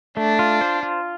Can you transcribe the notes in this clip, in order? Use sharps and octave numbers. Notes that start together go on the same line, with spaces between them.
A3 D4
F4
C5
F4